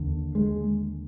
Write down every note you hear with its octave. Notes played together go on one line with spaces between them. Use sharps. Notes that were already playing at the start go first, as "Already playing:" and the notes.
Already playing: D#2 D3
G#3